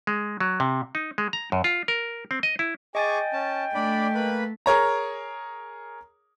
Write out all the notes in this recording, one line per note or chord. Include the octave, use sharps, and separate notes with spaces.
G#3
F#3
C3
D#4
G#3
A#5
F#2
F4
A#4
C4
D#5
E4
G#4 D#5 G5 G#5 C#6 D6 A6
C#4 A5
A3 D4 D5 B5
A#3 B4 B5
G#4 A#4 C#5 A#5